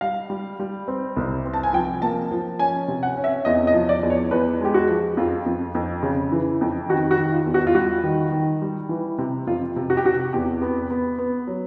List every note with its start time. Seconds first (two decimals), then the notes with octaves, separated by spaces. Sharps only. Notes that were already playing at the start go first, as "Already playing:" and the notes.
0.01 G3 F5
0.30 G3
0.60 G3
0.88 C4
1.16 C2
1.45 C4
1.53 A5
1.63 G#5
1.73 F3 G5
2.02 A#3 A5
2.31 F3
2.59 C#4 G#5
2.88 C3
3.03 F#5
3.17 C#4
3.24 E5
3.45 E2 D#5
3.67 D#5
3.74 F3
3.89 D5
4.03 E2
4.10 C#5
4.31 E2 B4
4.61 G#3 G4
4.74 F#4
4.88 F3
5.17 F2 F4
5.46 F2
5.75 F2
6.03 C#3
6.32 E3
6.61 F2
6.89 D#3 F#4
7.11 F#4
7.18 D#3
7.32 F4
7.46 E2
7.54 F#4
7.67 F4
7.75 G3 F#4
8.03 D#3
8.32 D#3
8.62 G3
8.89 E3
9.18 C3
9.47 F2 F4
9.76 C3
9.90 F#4
9.97 G4
10.05 C3 F#4
10.33 E2 G4
10.62 B3
10.91 B3
11.19 B3
11.47 F#3